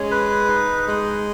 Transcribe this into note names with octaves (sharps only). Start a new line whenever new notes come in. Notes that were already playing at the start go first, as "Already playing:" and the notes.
Already playing: G#3 C#4
B4
D#4
G#3